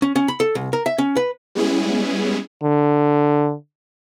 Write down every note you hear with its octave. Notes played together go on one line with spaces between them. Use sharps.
C#4
C#4
B5
A4
C2
A#4
E5
C#4
B4
G3 G#3 B3 C#4 E4 G#4
D3